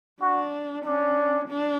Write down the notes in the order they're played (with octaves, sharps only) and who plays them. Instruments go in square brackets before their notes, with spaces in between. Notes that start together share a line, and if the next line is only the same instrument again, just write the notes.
[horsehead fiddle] D4 [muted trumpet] F#4
[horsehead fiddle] C#4 [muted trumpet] D4
[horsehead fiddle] D4